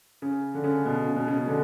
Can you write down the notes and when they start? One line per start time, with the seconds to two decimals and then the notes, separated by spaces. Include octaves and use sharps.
0.22 C#3
0.54 D3
0.64 C#3
0.85 B2
1.06 C#3
1.16 B2
1.27 C#3
1.38 C#3
1.48 B2 D3